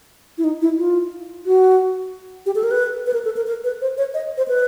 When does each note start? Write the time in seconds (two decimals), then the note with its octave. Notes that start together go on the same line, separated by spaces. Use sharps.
0.38 E4
0.44 D#4
0.62 E4
0.77 F4
1.46 F#4
2.46 G4
2.55 A4
2.63 A#4
2.71 B4
3.06 B4
3.13 A#4
3.25 A4
3.37 A#4
3.47 A#4
3.64 B4
3.82 C5
3.98 C#5
4.14 D#5
4.37 C5
4.48 B4